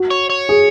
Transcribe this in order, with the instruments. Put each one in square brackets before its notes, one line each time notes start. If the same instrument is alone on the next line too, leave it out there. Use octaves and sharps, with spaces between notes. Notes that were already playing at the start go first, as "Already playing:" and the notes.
Already playing: [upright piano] F#4
[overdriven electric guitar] C#5
C#5
[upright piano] G#4